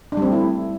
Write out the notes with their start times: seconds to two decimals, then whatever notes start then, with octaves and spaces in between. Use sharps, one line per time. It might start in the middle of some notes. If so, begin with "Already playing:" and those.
0.12 D4
0.17 G3
0.22 C4
0.27 A3
0.32 E4